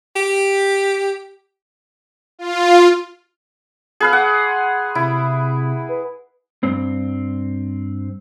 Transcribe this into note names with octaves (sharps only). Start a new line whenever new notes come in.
G4
F4
G#4 B4 F5 F6
F#5 D6
C6
C3 E4
B4
G2 C4